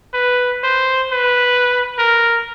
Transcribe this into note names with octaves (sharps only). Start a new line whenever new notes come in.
B4
C5
B4
A#4